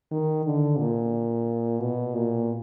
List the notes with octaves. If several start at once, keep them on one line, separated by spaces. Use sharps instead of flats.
D#3
D3
A#2
B2
A#2